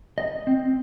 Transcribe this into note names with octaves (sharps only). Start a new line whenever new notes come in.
D#5
C4